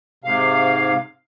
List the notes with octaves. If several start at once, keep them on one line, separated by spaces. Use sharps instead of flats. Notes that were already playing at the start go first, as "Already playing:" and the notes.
G#2 C3 F5